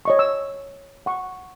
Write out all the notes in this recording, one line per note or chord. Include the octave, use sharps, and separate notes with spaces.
C#5 D#5 C#6
E6
F#5 C#6